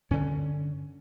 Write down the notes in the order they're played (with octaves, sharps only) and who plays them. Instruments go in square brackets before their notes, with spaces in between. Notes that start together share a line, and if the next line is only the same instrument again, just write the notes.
[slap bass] G2 D3 C#4